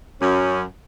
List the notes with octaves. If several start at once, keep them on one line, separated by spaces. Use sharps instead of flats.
F#2 C#4